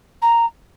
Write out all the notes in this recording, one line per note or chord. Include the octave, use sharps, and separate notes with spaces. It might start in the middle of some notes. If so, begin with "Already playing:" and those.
A#5